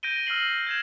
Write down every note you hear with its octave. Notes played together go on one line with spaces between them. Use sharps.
G6 A#6 D7 D#7 G7
E6 F6 A#6 C7 F#7
G6 G#6 E7